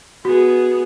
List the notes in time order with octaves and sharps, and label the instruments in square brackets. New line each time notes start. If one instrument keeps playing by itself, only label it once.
[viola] B3 G#4 [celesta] F#4